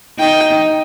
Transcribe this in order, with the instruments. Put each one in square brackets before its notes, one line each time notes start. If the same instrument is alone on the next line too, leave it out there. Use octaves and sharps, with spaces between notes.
[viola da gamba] D#4 [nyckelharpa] G5